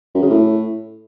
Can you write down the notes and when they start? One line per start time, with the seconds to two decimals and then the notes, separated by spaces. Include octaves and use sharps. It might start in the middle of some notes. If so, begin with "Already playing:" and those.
0.15 F#2
0.22 C#3
0.30 A2